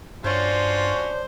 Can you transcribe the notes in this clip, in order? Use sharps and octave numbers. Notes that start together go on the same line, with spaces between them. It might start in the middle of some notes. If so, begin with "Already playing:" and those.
G2 C#4 D4 F4 F#4 C5 C#5